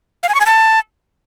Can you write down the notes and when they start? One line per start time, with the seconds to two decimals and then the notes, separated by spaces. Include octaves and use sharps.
0.23 F5
0.29 G#5
0.35 C#6
0.40 G#5
0.46 A5